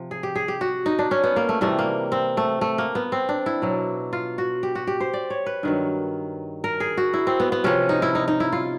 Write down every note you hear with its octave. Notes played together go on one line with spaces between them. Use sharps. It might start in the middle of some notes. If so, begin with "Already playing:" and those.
Already playing: C3 F3
G#4
G4
G#4
G4
F#4
D#4
D4
C#4
B3
A#3
A3
C3 E3 G3 A3
A#3
C4
A3
A3
A#3
B3
C4
D4
E4
B2 F#3
F4
F#4
G4
F#4
G4
C5
D5
C#5
B4
G2 D#3 F#3
A#4
G#4
F#4
E4
C4
B3
B3
C3 F3 C#4
D#4
E4
D#4
D#4
E4
F4